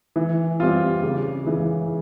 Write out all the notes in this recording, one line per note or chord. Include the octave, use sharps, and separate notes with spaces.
E3
G3 C4 F4
C#3
E3 G#3